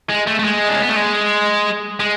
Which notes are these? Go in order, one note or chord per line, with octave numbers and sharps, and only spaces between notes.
G#3
A3
A3
G#3
D4
C#4
B3
A3
G#3
G#3